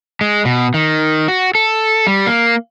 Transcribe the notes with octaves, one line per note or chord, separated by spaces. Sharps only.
G#3
B2
D#3
F#4
A4
G3
A#3